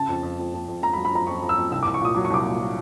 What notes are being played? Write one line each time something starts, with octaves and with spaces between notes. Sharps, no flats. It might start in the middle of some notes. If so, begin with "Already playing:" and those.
Already playing: C#3 A5
F2
F2
F2
F2
F2
F2 A#5
B5
F#3
B5
F2 A#5
F2 C#6
F2
E6
F2
C2 E6
D6
C2
C#6
A#2 D#6
F#3 D6
C#6
C2 D6
A#2
F#3